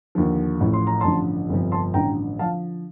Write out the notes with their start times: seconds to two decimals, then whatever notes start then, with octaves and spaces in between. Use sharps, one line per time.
0.15 D#2 D3 F3
0.60 A1 A2 F3
0.73 C6
0.87 A#5
1.01 A1 G2 D3 F3 A5 C6
1.49 G1 F2 C3 F3
1.72 A5 C6
1.94 A1 G2 D3 F3 G5 A#5
2.39 D3 F3 F5 A5